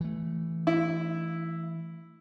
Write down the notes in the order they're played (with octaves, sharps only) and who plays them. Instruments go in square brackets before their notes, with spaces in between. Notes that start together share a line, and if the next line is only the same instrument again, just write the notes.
[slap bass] E3 A3
[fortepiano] E4